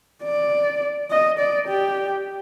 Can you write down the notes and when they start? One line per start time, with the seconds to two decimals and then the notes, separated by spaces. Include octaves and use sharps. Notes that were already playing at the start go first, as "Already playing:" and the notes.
0.23 D5
1.11 D#5
1.38 D5
1.68 G4